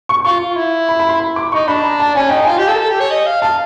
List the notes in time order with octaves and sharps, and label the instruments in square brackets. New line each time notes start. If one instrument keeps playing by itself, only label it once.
[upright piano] C#6
[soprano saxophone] F4 [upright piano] C#6
[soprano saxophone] F4
E4
[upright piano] B5
B5
C6
B5
D6
[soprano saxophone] D#4 [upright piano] C#6
[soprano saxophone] D4 [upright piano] B5
[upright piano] A#5
A5
[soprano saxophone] C#4 [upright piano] G#5
[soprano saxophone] D#4 [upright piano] G5
[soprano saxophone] F4 [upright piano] G#5
[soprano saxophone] G4
A4
A#4
A4
G4
C#5
D#5
F5
[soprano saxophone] F5 [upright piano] A5